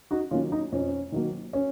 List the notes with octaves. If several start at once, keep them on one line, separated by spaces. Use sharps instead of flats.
D#4 F#4
D#3 F#3 A#3 C#4 F4
D#4
F2 C#4
D#3 F#3 A#3
C#4